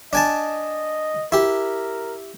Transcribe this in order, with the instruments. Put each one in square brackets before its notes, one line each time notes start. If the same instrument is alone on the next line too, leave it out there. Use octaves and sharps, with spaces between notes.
[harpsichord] D4 G#5 A5 [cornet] D#5
[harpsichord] E4 G4 [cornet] A#4